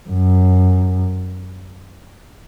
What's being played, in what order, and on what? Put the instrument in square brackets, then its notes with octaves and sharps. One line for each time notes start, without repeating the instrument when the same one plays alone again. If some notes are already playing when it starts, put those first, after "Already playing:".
[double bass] F#2